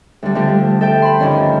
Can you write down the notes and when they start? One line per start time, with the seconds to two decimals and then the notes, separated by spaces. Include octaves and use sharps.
0.22 D2 G3
0.35 D3 F3 G3 A3
0.81 A4 E5 G5
1.02 B5 C6
1.20 D2 G2 D3 D#3 F3 C#4